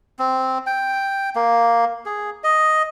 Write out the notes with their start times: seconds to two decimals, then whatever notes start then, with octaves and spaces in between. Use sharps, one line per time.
0.19 C4
0.67 G5
1.35 A#3
2.06 G#4
2.44 D#5